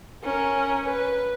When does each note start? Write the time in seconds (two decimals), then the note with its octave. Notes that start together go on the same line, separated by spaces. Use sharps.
0.24 C#4 A#4
0.86 B4